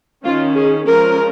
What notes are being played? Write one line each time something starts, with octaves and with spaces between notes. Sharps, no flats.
D#3 C#4 F4
G#4
F3 G#3 C#4 A#4